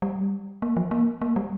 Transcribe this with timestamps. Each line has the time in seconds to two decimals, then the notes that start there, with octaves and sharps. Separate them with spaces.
0.02 G3
0.62 A#3
0.77 F3
0.91 A#3
1.22 A#3
1.36 G3